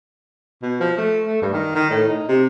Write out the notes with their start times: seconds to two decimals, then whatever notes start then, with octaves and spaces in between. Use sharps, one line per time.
0.62 B2
0.80 F3
0.98 A3
1.26 A3
1.42 G2
1.53 D#3
1.75 D#3
1.90 A2
2.08 D#4
2.28 C3